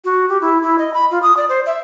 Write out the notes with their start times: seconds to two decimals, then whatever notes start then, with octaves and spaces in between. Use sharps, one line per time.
0.04 F#4
0.29 G4
0.41 E4
0.63 E4
0.78 D#5
0.94 B5
1.11 F4
1.22 D#6
1.37 D5
1.49 C5
1.66 E5